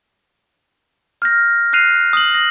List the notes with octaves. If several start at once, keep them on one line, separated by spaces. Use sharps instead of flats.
F6 G6 A#6
F6 F#6 C7 D#7 F7
D#6 F#7
A#6